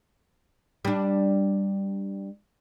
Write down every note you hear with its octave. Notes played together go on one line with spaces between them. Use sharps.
G3 D4